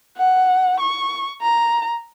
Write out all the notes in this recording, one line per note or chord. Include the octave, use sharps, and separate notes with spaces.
F#5
C#6
A#5